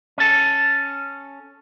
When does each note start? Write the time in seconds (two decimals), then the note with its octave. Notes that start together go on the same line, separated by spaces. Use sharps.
0.18 C#4 A4